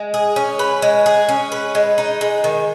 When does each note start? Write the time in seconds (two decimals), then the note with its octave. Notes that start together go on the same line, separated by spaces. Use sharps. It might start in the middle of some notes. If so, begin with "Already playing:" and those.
Already playing: G#3
0.14 G#4
0.36 C#4
0.59 B4
0.82 G#3
1.06 G#4
1.29 C#4
1.52 B4
1.75 G#3
1.98 D#4
2.21 G#3
2.44 D#3